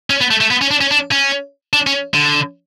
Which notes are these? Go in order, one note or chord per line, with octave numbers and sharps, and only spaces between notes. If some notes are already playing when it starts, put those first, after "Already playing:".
C#4
B3
A3
A3
B3
C#4
D4
C#4
D4
C#4
D4
C#4
D3